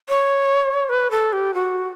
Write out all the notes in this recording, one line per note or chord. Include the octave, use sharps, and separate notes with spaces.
C#5
B4
A4
G4
F#4